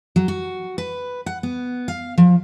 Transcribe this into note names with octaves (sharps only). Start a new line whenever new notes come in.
F#3
F#4
B4
F#5
B3
F5
F3